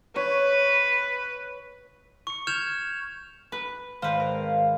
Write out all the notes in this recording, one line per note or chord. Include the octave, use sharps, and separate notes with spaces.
B4 C#5
C#6 C#7
F6 G6 G#6 C#7 E7 F7
B4
G#1 B4 C5 F5
A#4